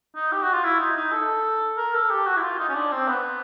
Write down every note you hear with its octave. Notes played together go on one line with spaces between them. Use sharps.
D#4
G4
F#4
F4
E4
D#4
D#4
A4
A#4
A4
G4
F#4
E4
F4
D#4
C#4
D4
C4
B3